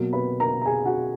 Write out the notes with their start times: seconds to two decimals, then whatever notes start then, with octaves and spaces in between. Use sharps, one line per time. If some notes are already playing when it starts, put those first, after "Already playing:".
Already playing: B2 F#3 A#3
0.13 B4 B5
0.40 A#4 A#5
0.61 A#5
0.65 G#4 G#5
0.85 F#4 F#5